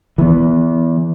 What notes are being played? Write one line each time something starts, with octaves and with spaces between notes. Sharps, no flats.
E3 B3